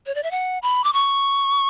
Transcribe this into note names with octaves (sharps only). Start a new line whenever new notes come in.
C#5
D5
E5
F#5
B5
D6
C#6